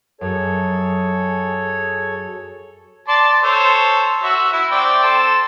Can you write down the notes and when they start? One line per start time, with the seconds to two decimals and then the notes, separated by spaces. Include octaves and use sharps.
0.21 F#2 G#4 A4 C#5
3.08 D5 A5 C6
3.43 A4 C5 C#5
4.23 F#4 E5
4.53 E4
4.71 C4 D5 G5
5.03 A4 C5 A5